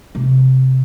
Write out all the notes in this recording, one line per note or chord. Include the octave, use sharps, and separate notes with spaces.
C3